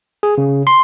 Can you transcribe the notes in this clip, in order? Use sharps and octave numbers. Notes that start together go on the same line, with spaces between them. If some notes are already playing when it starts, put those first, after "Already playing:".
G#4
C#3
C6